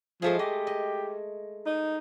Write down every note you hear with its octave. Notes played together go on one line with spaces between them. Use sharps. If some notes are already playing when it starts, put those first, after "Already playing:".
F3 G#3 A3 G#4
G4 D#5
D#5
D#4